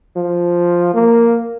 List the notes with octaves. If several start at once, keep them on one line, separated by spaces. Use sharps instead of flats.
F3
A#3